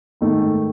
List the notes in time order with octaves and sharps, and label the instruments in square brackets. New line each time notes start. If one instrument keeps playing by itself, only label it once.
[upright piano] G#2 D#3 A3